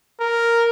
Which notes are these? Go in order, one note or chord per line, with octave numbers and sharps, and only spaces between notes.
A#4